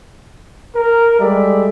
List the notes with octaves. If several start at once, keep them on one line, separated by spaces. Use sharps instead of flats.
A#4
G3 G#3 A4 D5 E5